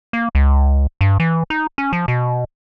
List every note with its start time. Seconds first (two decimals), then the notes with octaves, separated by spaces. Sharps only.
0.13 A#3
0.35 C#2
1.01 G2
1.20 E3
1.50 D#4
1.78 C#4
1.93 F3
2.08 B2